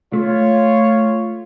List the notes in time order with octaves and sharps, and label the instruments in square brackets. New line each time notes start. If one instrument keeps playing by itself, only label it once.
[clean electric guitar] A3 [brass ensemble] F4 C#5